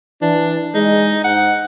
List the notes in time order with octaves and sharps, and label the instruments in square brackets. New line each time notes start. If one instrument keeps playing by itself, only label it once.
[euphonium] E3 [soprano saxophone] D4
[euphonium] G#3 [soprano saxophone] D#4
[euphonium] G#2 [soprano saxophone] F#5